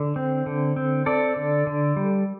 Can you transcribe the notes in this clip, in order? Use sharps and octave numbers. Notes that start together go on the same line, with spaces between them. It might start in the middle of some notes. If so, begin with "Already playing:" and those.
Already playing: D3
C4
D3
C4
C4 A4 D5
D3
D3
G3